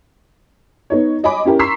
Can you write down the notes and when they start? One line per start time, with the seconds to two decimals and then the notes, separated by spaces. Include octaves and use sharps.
0.90 B3 D#4 C#5
1.23 C#5 D#5 G#5 B5 D6
1.45 C#4 E4 G4 A#4
1.59 A#5 C6 C#6 E6 B6 C7